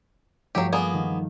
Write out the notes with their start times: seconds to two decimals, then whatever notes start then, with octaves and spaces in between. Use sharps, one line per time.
0.55 G2 F3 F#3 A3 G4
0.73 A#3 B3 G#4
0.93 D#3